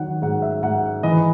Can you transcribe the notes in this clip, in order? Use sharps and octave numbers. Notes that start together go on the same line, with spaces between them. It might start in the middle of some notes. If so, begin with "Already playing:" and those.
Already playing: D#3 F#3 F#5
G#2 F#5
E5
G#2 F#5
E3 D#5